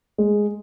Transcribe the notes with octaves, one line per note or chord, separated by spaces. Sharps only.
G#3